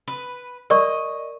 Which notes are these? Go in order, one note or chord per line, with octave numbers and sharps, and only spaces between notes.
B4
A#4 D5 D#5 C#6